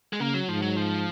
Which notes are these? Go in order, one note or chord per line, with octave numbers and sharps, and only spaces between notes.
G#3
C#3 A#3
F#3
G#2 F3
F#3
F3